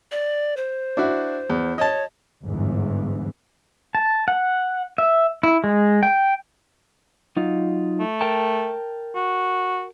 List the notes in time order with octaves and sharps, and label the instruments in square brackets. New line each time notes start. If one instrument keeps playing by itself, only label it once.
[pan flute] D5
C5
[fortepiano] D4 E4 F#4
E2
[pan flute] C#5 [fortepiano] D#5 A5
[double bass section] G1 E2 G#2 E3
[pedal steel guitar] A5
F#5
E5
E4
G#3
G5
[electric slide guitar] F#3 D#4 F4
[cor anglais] A3
[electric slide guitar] A#4 G5 A5
[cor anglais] F#4